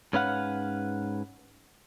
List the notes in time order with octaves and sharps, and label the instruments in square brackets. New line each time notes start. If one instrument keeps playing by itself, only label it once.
[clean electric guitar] G#2 C#4 B4 F5 F#5